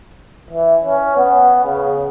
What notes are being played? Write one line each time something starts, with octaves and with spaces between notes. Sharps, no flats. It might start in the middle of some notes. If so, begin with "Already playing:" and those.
E3
C#4
B3
C#3